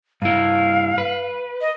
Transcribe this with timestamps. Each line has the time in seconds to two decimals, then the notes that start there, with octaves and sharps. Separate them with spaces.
0.22 G2 E4 F5
0.98 B4
1.61 D#5